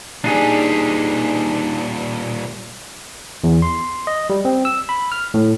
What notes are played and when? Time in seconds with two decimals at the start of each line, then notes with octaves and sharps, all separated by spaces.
0.24 A#2 G3 D4 D#4 G#4
3.44 E2
3.62 C6
4.07 D#5
4.30 G3
4.45 C4
4.65 E6
4.89 B5
5.12 F6
5.34 A2